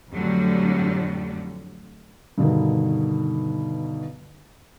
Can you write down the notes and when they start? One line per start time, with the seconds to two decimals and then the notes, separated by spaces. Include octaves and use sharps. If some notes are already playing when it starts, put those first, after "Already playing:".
0.12 F2 A2 D3 F#3 G3
2.38 G2 B2 D3 D#3